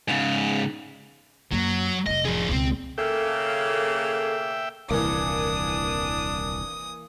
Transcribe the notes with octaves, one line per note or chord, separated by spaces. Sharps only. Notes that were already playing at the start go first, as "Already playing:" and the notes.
G#2 C#3
F#2 F#3 A#3
F1 F#3 D#5
F3 G#4
C#2 B2 C4
C#3 A#3 A4 E5 G5
D#1 C2 E3 A#3 D4 D#6